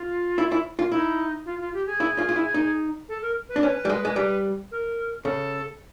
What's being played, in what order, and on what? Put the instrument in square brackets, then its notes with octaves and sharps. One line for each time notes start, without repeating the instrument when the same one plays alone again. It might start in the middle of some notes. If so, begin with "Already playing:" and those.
Already playing: [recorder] F4
[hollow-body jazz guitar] E4
E4
F4
[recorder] D#4 [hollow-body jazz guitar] E4
[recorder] F4
F4
G4
G#4
[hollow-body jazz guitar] E4
F4
F4
E4
D#4
[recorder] A4
A#4
B4
[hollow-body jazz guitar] D4
[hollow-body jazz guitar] C#4 [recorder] B4
[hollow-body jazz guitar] G3
G#3
G#3
G3
[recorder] A#4
[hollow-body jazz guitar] C#3 [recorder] A4